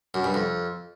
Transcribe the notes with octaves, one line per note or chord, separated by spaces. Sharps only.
F#2
G2
F2